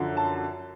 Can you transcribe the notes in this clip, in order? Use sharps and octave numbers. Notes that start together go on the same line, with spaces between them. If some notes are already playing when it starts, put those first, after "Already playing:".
Already playing: F#2 D3 F3
A5